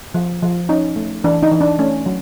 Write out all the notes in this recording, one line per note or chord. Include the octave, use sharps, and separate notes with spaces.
F3
F3
C#4 D#4
A3
E3 D4
D#4
E3
D4
A3 C#4
F#3